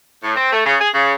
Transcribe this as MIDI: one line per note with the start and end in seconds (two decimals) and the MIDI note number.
0.23 0.34 45
0.36 0.51 60
0.52 0.61 57
0.65 0.75 49
0.81 0.89 68
0.94 1.12 49